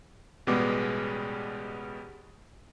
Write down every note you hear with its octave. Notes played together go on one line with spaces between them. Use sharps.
A1 B2 G3 G#3 B3 D6